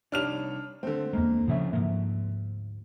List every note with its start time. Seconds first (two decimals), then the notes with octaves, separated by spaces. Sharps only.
0.12 C2 D4 D#4 C#5 F6 F7
0.83 D3 A3 C4
1.13 E2 G#3 A#3
1.48 A2 C#3 F3 C#4 E5
1.73 D2 G#2 F3 A#3